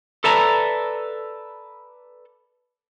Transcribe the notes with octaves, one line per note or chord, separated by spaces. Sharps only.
A4 B4 D5 E5 A5 A#5